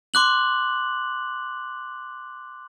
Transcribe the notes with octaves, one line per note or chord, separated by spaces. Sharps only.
C6 D6 F#6 F#7